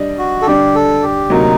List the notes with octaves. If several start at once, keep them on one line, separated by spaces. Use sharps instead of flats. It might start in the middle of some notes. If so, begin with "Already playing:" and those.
Already playing: G3 D4 D#5
F#4
A4
D3 G3 D4 G4
A4
G4
D2 C3 F#3 A#3 D#4 F#4